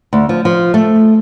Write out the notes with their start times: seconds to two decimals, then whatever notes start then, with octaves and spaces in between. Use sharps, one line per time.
0.13 D2
0.29 F3
0.45 F3
0.74 A3